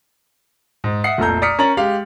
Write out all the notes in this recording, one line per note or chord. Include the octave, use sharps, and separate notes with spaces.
G#2
E5 F#5 D#6 C7 C#7
F1 C2 A#2 A4 A#5 G6
D5 A#5 D#6 F6 B6 C#7
C#4 A#4 A#5 A6 F#7
G#3 G4 F5